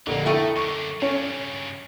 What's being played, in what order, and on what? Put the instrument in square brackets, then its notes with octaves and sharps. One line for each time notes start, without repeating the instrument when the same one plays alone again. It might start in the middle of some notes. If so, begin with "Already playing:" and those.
[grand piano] F1 A#1 D3 [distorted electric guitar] F#3 A#3
[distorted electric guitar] A3 [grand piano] E4 G5 C#6 [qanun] A4 A#4 D#5
[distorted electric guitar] F#2 D3 [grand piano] C#6
[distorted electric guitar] G2 C#3 [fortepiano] C#4